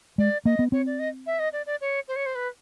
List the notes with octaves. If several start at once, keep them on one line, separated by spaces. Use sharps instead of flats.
G#3 D5
A#3 D#5
B3
C4 C#5
D5
D#5
E5
D#5
D5
D5
C#5
C5
C#5
C5
B4